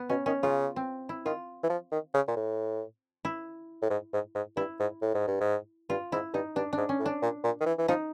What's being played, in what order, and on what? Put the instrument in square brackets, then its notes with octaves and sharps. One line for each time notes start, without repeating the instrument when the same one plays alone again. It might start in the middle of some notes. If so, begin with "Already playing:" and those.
Already playing: [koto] B3
[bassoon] B2 [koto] C#4
[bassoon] D#3 [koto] C#4
[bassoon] C#3 [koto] F4
[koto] C4
E4
[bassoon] D#3 [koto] F4
[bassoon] E3
F3
D#3
C#3
A#2
A2
[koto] E4
[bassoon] A2
G#2
G#2
G#2
[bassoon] G2 [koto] E4
[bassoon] G#2
A2
G#2
G2
G#2
[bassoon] G2 [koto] F4
[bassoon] G#2 [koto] E4
[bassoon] G2 [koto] D#4
[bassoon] G2 [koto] D4
[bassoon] G#2 [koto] D4
[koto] C#4
[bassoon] A2
[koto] D4
[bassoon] A#2
A#2
D#3
E3
E3
[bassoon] F3 [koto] D#4